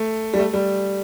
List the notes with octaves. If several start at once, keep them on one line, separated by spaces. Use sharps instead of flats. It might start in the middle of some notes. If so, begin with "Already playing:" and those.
Already playing: A3
G3
A3
G3